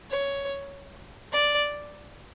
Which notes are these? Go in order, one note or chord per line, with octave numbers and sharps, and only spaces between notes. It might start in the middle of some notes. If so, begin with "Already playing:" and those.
C#5
D5